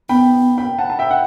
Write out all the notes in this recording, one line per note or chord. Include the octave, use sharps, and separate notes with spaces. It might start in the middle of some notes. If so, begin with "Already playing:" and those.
B3 G5 B5
G5 B5
F#5 A5
A5
E5 G5
F#5